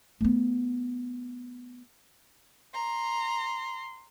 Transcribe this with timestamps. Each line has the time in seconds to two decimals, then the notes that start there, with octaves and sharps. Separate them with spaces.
0.21 A3 B3
2.74 A#5 C6